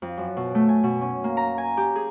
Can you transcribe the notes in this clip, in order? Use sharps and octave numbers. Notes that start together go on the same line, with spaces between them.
F2
F#2
B2
A3
G#5
B2
C#4
A#3
A#5
G#5
G4
G#4